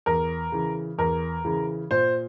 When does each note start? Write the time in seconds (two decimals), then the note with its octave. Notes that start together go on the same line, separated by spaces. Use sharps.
0.06 E2 A#4
0.52 C#3 E3
0.98 E2 A#4
1.45 C#3 E3
1.91 A#2 C5